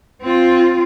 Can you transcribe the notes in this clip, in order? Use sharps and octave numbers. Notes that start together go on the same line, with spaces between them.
C4 F4